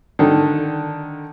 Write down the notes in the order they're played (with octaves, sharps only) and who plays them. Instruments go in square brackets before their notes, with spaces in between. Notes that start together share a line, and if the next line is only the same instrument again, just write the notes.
[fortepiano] D3 D#3